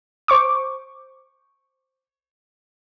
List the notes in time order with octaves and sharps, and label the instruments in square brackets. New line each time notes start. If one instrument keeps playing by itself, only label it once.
[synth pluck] C5 C#6 D6